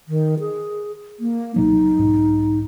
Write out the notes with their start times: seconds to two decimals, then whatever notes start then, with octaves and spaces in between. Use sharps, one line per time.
0.08 D#3
0.40 G#4
1.20 A#3
1.56 C#2 B2 F#3 D#4
1.99 B1 G#2